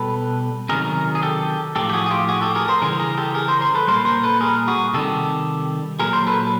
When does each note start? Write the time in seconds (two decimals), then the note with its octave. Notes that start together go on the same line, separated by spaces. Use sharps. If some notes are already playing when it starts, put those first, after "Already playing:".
Already playing: B2 G3 A4 B4
0.69 C3 D#3 F#3 G#4 A#4
1.15 G#4
1.22 G4 A4
1.76 A2 F3 G4 A4
1.89 G4
1.93 F#4 G#4
2.06 G#4
2.11 F4 G4
2.29 F#4 G#4
2.41 G4 A4
2.55 G#4 A#4
2.68 A#4 C5
2.82 C#3 E3 G3 G#4 A#4
3.00 G#4 A#4
3.18 G4 A4
3.34 G#4 A#4
3.48 A#4 C5
3.61 A#4 C5
3.75 A4 B4
3.87 A#2 G3 A#4 C5
4.05 A#4 C5
4.23 A4 B4
4.41 G#4 A#4
4.68 F#4 G#4
4.94 C3 D#3 G3 G4 A4
6.00 A#2 F#3 G#4 A#4
6.13 A#4 C5
6.27 A4 B4